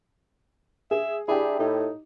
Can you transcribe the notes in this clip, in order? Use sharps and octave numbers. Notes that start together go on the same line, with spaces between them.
G#4 E5
D4 E4 G4 G#4
A2 D#4